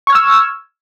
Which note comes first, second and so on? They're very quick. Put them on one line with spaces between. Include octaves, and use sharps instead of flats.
C#6 G#6 F6 E6